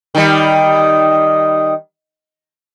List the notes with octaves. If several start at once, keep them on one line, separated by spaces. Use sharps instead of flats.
D#3 G3